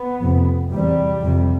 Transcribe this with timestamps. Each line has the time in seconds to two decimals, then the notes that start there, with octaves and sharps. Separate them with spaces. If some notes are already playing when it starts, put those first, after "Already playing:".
Already playing: B3
0.21 F2 C3
0.70 E2 C3 G3
1.20 F2 C3